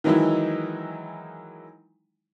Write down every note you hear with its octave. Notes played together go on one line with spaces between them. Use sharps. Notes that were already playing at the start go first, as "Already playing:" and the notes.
D#3 E3 F#3 G#3 D#4 E4